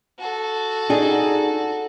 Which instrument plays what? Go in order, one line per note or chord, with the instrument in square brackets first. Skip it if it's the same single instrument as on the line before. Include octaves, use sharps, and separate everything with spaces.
[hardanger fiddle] F#4 A4
[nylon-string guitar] D4 D#4 G#4